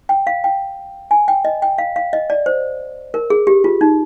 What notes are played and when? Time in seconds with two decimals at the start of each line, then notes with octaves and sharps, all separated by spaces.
0.09 G5
0.27 F5
0.44 G5
1.11 G#5
1.28 G5
1.45 D#5
1.62 G5
1.78 F5
1.96 F5
2.13 D#5
2.30 D5
2.46 C5
3.14 A#4
3.30 G#4
3.47 G4
3.64 F4
3.81 D#4